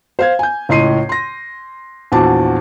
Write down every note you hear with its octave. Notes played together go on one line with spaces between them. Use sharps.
C5 F5 G#6
G#5 G6
C#2 A2 D#5 C6 C7 D#7
C6 A#6
A#1 E2 F#4 A5 D6